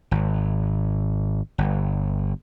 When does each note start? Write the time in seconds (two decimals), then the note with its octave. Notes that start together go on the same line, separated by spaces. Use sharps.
0.11 G#1
1.58 G1